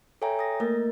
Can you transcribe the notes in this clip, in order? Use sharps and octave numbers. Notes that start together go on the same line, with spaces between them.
A4 C#5 E5 G5 G#5 A#5
D#6 A#6
A3 A#3 A#4 A6